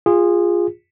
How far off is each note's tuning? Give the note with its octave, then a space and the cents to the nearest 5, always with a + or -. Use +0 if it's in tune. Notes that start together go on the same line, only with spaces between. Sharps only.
F4 +0 G#4 -20